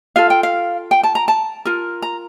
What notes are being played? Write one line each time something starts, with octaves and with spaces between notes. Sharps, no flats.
F4 A4 F5
G5
F5
G5
A5
A#5
A5
F4 A#4
A#5